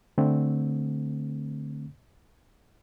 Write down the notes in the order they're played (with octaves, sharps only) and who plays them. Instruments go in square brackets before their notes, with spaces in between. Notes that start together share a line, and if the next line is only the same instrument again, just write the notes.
[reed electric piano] D3 A3 C4